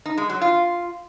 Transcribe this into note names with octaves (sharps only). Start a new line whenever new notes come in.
D#4
G#3
F#3
F4